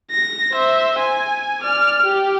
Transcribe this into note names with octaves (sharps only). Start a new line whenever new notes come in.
A#6
C5 E5
G#5
D5 F6
G4